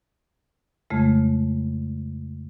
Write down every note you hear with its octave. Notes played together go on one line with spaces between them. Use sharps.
F2 C#3 G#3 A3